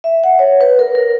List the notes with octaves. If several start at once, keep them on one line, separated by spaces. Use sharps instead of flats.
E5
F#5
C#5
B4
A#4
A#4